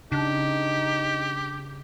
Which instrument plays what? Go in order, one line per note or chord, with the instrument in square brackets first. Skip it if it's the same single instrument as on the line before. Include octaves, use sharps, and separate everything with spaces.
[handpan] C#3 [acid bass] D4 [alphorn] D#4 [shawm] G4